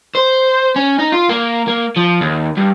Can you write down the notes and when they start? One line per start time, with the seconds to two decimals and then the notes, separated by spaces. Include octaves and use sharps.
0.15 C5
0.76 C#4
0.99 D#4
1.13 F4
1.30 A#3
1.68 A#3
1.97 F3
2.21 D#2
2.57 G2